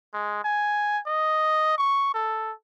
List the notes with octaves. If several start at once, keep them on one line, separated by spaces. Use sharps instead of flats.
G#3
G#5
D#5
C#6
A4